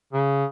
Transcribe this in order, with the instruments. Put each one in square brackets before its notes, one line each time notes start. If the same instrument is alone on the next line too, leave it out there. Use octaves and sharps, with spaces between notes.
[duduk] C#3